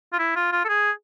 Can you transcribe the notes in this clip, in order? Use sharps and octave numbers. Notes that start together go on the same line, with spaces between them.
F4
E4
F4
F4
A4
G#4